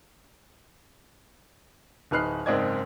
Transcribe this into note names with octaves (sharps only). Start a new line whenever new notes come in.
D1 D#4 B4 F6 F#6 C7
F#1 G#2 C4 D5 D#5 G#6